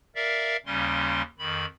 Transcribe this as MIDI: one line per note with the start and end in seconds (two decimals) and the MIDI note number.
0.15 0.57 70
0.15 0.57 74
0.15 0.57 76
0.15 0.57 77
0.66 1.22 39
0.66 1.22 49
0.66 1.22 55
0.66 1.22 61
0.66 1.22 84
1.39 1.65 41
1.39 1.65 51
1.39 1.65 83